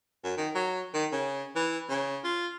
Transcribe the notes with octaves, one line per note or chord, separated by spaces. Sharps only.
F#2
D#3
F#3
D#3
C#3
E3
C#3
F4